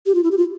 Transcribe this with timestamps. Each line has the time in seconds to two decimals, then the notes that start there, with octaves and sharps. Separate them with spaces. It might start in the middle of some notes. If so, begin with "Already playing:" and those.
0.06 G4
0.15 F4
0.23 E4
0.31 G4
0.38 F4